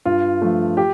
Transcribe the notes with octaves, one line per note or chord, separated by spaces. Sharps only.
G2 F4
F3 A3
G4